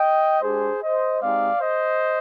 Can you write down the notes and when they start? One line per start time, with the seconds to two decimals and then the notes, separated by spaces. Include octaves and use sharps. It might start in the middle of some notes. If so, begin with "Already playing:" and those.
Already playing: D#5 G5
0.42 G#3 D4 G4 G#4 C5
0.82 C5 D#5
1.21 G#3 C4 D#4 G4 D5 F5
1.61 C5 D#5